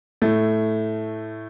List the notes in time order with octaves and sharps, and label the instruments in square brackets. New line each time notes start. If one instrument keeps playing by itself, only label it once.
[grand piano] A2 A3